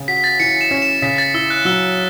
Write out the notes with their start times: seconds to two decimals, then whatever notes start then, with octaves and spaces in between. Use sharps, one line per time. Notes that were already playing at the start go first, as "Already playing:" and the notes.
Already playing: C#3
0.08 F#4 B6
0.24 A6
0.40 E3 C#7
0.61 E7
0.71 C#4
0.82 E7
1.02 C#3 B6
1.18 A6
1.34 E4 E6
1.50 F#6
1.65 F#3 E6